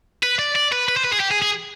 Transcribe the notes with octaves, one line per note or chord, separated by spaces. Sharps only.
B4
D5
D5
B4
B4
C5
B4
G#4
G4
G#4
G#4